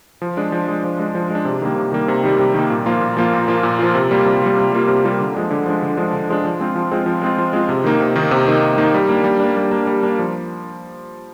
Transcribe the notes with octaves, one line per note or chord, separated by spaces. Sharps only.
F3
G#3 D4
F3
G#3 D4
F3
G#3 D4
F3
G#3 D4
C3
D#3 G3 A#3
C3
D#3 G3 A#3
C3
D#3 G3 A#3
C3
D#3 G3 A#3
A#2
F3 A#3 F4
A#2
F3 A#3 F4
A#2
F3 A#3 F4
A#2
F3 A#3 F4
C3
G3 A#3 F4
C3
G3 A#3 F4
C3
G3 A#3 F4
C3
G3 A#3 F4
D3
F3 G#3 D4
D3
F3 G#3 D4
D3
F3 G#3 D4
D3
F3 G#3 D4
F3
G#3 C4 F4
F3
G#3 C4 F4
F3
G#3 C4 F4
F3
G#3 C4 F4
C3
D#3 A#3 D#4
C3
D#3 A#3 D#4
C3
D#3 A#3 D#4
C3
D#3 A#3 D#4
G3
A#3 D4
G3
A#3 D4
G3
A#3 D4
G3
A#3 D4
F3